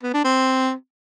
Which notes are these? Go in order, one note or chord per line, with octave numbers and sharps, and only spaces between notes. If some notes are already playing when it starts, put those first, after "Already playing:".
B3
D4
C4